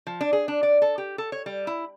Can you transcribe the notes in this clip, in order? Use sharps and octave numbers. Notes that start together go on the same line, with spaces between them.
F3
D4
G#4
D4
D5
A4
G4
A4
C#5
G3
E4